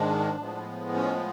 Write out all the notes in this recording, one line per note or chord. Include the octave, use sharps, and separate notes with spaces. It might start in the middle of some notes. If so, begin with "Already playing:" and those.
Already playing: G#2 D#3 G#3 D4
A2 F3 G#3 B3
C#4